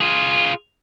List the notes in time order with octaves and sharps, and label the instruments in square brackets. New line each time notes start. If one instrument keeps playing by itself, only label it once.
[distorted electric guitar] F4 G#4